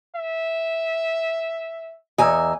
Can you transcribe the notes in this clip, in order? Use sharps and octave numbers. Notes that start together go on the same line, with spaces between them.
E5
E2 D#5 G#5 A#5 E6